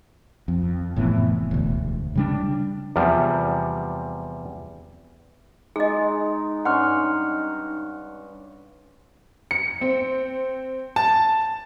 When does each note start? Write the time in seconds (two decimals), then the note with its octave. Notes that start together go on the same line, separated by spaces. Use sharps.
0.48 F2
0.96 F1 A2 E3 B3
1.51 E1 D2
2.15 C#3 G3 D4
2.96 E2 C3 F3 G3
5.76 G#3 D#4 G#4 D#5
6.65 G2 C#4 F#5 C6 F6
9.51 C#7
9.81 C4
10.96 A5